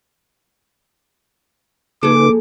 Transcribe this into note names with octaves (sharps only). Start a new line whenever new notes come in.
C#3 F3 A#3 D#4 G#4 A4 B4 D6